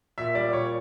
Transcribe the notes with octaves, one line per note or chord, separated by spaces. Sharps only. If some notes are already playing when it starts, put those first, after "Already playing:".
A#2 E5
G3 D5
A#2 C#5